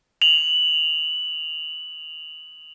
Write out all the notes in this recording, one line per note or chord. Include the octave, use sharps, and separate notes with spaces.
F7 F#7